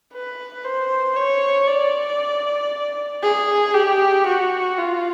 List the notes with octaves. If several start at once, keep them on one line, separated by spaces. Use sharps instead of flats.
B4
C5
C#5
D5
G#4
G4
F#4
F4